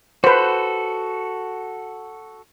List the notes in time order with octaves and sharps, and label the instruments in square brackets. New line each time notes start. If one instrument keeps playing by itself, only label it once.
[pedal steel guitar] F#4 A4 [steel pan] B4 C5